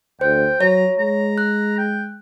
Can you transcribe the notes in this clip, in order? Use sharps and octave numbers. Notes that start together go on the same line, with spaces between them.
D2 C5 G5
F#3 C#5 A#5
G#3 A#5
F#6
G5